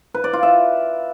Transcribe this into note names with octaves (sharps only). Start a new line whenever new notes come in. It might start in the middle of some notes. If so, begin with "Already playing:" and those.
B4
D5
F4
E5